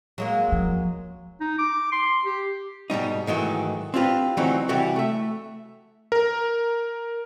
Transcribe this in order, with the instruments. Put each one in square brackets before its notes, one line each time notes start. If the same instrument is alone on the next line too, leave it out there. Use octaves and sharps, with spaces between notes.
[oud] F#3 G#3 A#3
[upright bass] F#2 F3
[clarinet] D#4
D6
C6
G4
[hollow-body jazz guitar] G#2 B2 G3 D#4
G#2 D#3 E3 F#3 A3
C4 D4 F4 G4 B4
D3 E3 F#3 A3 C4 D#4
C3 E3 G3 F#4 G4
A3 E5
[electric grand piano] A#4